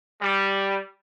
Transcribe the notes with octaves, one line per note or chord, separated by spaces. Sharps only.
G3